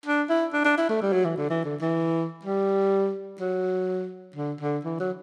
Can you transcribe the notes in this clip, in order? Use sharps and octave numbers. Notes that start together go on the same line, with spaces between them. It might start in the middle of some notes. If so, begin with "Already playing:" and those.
D4
E4
D4
D4
E4
A3
G3
F#3
E3
D3
E3
D3
E3
G3
F#3
D3
D3
E3
F#3